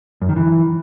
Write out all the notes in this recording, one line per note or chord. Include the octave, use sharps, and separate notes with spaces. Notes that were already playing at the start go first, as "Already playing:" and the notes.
F#2
D#3
E3